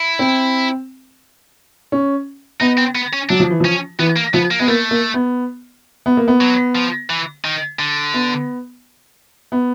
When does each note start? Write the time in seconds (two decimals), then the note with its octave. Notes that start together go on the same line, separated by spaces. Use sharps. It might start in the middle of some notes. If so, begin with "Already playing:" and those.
Already playing: E4
0.19 C4
1.92 C#4
2.60 B3 D#4
2.78 C4
2.95 B3
3.13 C#4
3.29 F#3 D4
3.40 F3
3.50 E3
3.60 F3 C#4
3.99 E3 B3
4.16 A#3
4.34 F3 B3
4.51 A#3
4.59 G#3 B3
4.68 A3 A#3
4.91 A#3
5.14 B3
6.06 B3
6.17 A#3
6.28 B3
6.41 F#3
6.75 F3
7.10 E3
7.45 D#3
7.79 D3
8.14 B3
9.52 B3